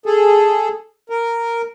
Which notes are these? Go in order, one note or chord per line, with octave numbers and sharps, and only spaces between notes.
G#4 A4
A#4